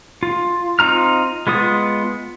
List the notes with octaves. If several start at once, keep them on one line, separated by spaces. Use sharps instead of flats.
F4
C4 D#4 F4 A#5 F6
G#3 B3 F4 D#6